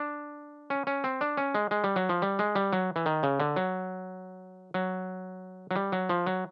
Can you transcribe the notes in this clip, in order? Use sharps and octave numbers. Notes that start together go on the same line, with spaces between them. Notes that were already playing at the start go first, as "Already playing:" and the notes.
Already playing: D4
C#4
C#4
C4
D4
C#4
G#3
G#3
G3
F#3
F3
G3
G#3
G3
F#3
E3
D#3
C#3
D3
F#3
F#3
F#3
G3
F#3
F3
F#3